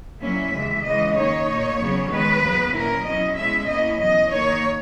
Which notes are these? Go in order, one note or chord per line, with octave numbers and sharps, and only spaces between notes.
A#2 F#3 A#3 C#4 E4 E5
D#2 C#3 E3 G#3
C#3 E3 G#3 D#5
D#3 A#3 D#4 C#5
A#2 A#3 D#4
E2 C#3 F#3 B3
D#3 G#3 B3 B4
D#2 C#3 F#3 B3
A#2 F#3 C#4 E4 A#4
B2 F#3 C#4 E4 D#5
B2 G#3 C#4 E4 E5
B2 A#3 C#4 E4 D#5
E2 B2 F#3 D#5
D#3 A#3 D#4 C#5